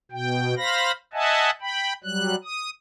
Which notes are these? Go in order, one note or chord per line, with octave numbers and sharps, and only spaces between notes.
B2 G5
C5 F5 B5 A#6
D#5 E5 F#5 G#5 A5
G5 B5
F#3 G3 F#6
D#6